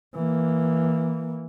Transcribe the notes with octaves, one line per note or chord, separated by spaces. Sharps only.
E3 A#3